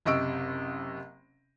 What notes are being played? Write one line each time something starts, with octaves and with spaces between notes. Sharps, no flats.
F#1 C3 D#5 C#6 E6 D7